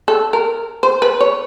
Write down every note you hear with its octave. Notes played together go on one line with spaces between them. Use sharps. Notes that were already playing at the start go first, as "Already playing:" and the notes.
A4
A#4
C5
B4
C#5